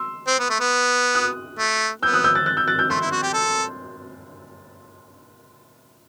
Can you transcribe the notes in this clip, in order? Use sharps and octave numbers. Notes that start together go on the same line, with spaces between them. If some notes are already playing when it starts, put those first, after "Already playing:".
Already playing: C6 E6
C4
B3
A3
B3
D#6 F#6
A3
B3 E6 G6
D#6 F#6
E6 G6
F#6 A6
F#6 A6
E6 G6
F#6 A6
E6 G6
A3 C6 E6
E4
F#4
G4
A4